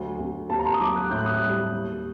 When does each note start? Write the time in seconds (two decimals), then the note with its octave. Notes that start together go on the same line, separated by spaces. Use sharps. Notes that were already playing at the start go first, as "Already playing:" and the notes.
Already playing: D2 F#3
0.20 D2
0.49 D#2 A5
0.59 A#5
0.65 C6
0.74 D#6
0.80 F#3 D6
0.96 F#6
1.11 A2 G6
1.18 F#6
1.26 D#6
1.34 F#6
1.42 G3
1.72 D#2